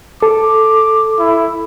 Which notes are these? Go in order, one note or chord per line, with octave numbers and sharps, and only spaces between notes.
A4 D6
E4